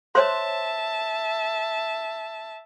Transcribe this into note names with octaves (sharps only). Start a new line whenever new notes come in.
C5 C#5 E5 A5 C6